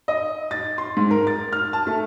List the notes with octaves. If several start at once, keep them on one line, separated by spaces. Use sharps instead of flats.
D#5
A6
C6
G#2
A#4
A6
F6
A5
A3